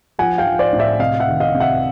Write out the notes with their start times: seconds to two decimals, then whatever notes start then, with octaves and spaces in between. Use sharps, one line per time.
0.19 F3 F#5 G#5
0.38 F5 G5
0.46 F3
0.59 C5 D5
0.73 A2
0.79 D5 E5
0.99 C3 D#5 F5
1.20 E5 F#5
1.28 D#3
1.40 D#5 F5
1.54 C3
1.60 E5 F#5